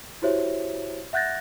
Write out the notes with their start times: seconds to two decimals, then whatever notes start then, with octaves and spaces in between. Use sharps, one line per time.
0.22 E4 F#4 G4 C5 C#5 E5
1.13 E5 F#5 F#6 G6 A6 A#6